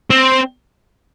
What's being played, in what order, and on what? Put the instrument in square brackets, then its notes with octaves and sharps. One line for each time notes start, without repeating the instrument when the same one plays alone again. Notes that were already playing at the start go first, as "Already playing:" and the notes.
[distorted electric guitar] C4